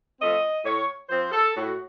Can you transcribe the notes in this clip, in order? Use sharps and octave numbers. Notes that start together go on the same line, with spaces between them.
F3 A3 C4 D#5
A2 C#5
F3 C4 C5
A4
A2 F#4